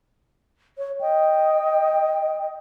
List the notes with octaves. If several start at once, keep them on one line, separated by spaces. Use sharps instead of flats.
C#5
D#5 G5